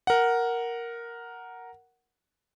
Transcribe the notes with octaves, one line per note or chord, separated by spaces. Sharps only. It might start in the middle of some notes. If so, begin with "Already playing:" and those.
A#4 F#5